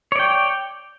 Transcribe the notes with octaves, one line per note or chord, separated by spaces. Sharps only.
C#5 D5 G5